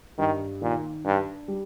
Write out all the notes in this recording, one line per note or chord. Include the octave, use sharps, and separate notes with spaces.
G2 D#3
A#2 D#3
G2 D4
G3